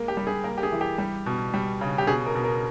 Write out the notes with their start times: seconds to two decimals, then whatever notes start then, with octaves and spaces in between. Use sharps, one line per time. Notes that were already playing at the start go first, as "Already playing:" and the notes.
Already playing: G#3 A#3
0.08 G4
0.17 G3
0.27 G#4
0.44 A#3 A#4
0.57 G4
0.63 G#4
0.72 E3
0.81 G4
0.98 G3
1.26 B2
1.54 G3
1.81 C#3
1.98 G4
2.07 B2 G#4
2.26 A#4
2.35 B2
2.44 A#4